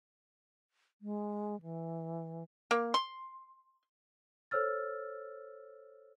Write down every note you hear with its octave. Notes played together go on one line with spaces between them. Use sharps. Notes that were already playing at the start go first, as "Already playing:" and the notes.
G#3
E3
A#3
C6
A4 C5 C#5 E6 F6 A6